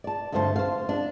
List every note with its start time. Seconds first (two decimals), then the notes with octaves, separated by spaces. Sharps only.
0.04 D5 A5
0.32 D2 G2 D3 A3 C5 A5
0.56 C5 F5
0.89 D4